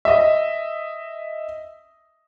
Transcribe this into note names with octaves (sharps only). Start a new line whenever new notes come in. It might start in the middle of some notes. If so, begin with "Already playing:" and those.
D#5 E5